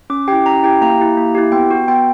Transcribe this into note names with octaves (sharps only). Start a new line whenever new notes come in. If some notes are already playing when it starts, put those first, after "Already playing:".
C#4 D6
E4 G4 G5
C#4 A#5
E4 G4 G5
A#3 A#5
E4 G4
A#3
E4 G4
B3 G5
F#4
B3 G5